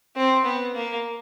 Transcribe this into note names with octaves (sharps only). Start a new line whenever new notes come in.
C4
B3
A#3